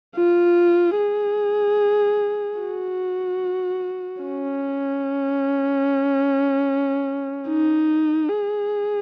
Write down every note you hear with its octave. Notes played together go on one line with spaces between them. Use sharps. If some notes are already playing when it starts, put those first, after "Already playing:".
F4
G#4
F#4
C#4
D#4
G#4